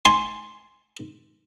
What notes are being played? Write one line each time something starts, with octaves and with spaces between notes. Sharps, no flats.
G#5 C6